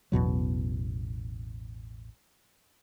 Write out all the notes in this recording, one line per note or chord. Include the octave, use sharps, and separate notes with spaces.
A1 E2 B2 F#3